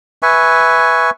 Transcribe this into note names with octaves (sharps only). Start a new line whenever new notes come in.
B4 E5 G#5 C#6